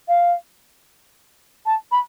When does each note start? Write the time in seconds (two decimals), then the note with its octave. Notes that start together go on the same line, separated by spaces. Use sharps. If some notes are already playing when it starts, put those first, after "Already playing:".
0.08 F5
1.65 A5
1.91 B5